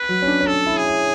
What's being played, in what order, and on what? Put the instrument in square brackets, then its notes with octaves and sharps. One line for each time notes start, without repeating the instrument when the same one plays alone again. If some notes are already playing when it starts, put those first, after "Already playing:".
Already playing: [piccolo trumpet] B4
[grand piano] F#3
C#4
D4
C#4
[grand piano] D4 [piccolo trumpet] A4
[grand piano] E4
[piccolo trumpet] G#4
[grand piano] E4